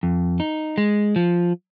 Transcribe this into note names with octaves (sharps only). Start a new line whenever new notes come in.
F2
D#4
G#3
F3